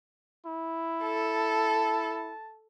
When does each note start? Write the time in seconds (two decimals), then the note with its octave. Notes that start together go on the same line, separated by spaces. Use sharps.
0.46 E4
1.03 A4 A5